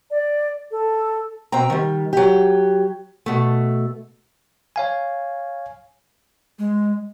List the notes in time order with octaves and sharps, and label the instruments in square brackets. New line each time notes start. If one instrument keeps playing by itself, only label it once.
[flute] D5
A4
[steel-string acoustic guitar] B2 C4 G5 A#5
D#3 G3
F#3 G4
B2 A3
[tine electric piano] C#5 F5 G#5
[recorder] G#3